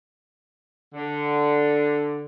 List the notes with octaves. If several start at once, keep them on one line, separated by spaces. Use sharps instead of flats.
D3